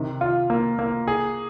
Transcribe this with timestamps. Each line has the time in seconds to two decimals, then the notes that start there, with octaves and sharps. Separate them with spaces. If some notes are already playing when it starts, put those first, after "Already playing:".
Already playing: C3 D#3
0.21 F4
0.50 A#3
0.79 A#3
1.08 G#4